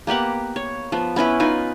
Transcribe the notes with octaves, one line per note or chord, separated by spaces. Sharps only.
A#3 B3 G4 F#5
C#5
F3 B3
B3 C#4 E4 B4
D#4 F4 B4 G#5